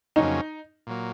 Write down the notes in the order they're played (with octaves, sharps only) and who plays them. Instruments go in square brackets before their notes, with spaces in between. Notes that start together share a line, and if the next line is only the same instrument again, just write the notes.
[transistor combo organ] F2 C#3 F#3 A#3 C#4 [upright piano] D#4
[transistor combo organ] A#2 F#3 A#3